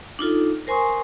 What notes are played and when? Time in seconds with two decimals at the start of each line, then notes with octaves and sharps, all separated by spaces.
0.19 D4 D#4 F4 A4
0.67 A#4 C5 G#5 C6 C#6 D#6